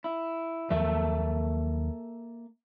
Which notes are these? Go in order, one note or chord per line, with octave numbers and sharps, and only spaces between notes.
E4
D#2 F3 F#3 A#3 A4 E5